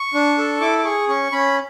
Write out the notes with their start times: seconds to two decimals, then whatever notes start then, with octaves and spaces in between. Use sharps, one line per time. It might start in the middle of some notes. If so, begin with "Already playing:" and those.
Already playing: C#6
0.14 D4
0.38 A4
0.61 E4 D6
0.79 D6
0.84 G#4 C#6
1.08 C#4 C#6
1.32 C#4 B5